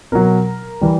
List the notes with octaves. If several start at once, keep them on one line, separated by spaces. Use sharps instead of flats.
B2 F#3 A#4
E3 G3